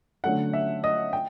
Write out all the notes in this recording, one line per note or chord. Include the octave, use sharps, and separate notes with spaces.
D3 F#3 A3 C#4 F#5
E5
D#5
G5